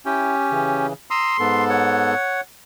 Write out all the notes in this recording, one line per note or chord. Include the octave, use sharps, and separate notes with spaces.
C#4 E4 G4 G5
C#3 E3
A#5 C6 D#6 E6
G#2 B3 A4
C#5 F#5